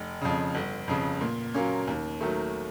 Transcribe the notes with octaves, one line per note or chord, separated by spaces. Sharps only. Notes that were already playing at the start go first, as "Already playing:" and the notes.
Already playing: F1
F2 C#3
G1
F2 C#3
A#2
F#3 A#3 C#4
D#2
D#3 F#3 A3